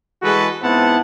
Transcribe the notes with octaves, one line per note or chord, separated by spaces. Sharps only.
E3 G#3 F#4 G#4 A4 B4
G#2 B3 C4 E4 F#5 A5